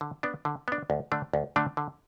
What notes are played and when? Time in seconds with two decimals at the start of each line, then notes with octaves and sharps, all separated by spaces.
0.01 D3
0.23 B3 D4
0.45 D3
0.68 B3 D4
0.90 D2
1.12 D3 A3 D4
1.34 D2
1.56 D3 A3 D4
1.77 D3